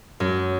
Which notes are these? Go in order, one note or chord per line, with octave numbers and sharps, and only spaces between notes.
F#2